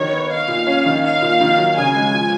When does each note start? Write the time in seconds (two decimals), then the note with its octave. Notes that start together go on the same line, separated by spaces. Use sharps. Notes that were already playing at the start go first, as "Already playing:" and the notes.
Already playing: D#3 F#4 C#5
0.11 B3
0.29 D#4 F5
0.48 A#2
0.67 C#4
0.86 D#3
1.04 D#4 F5
1.22 A#2
1.40 D#3
1.58 F#3
1.76 C#3 G#5
1.95 G#3
2.13 F3